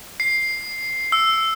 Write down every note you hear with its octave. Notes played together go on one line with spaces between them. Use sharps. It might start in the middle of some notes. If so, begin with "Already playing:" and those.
C7
E6